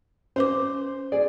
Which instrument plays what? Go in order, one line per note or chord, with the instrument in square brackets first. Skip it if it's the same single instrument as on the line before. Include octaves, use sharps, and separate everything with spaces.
[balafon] C#4 B4 D6 [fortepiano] C5
[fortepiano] G#4 D5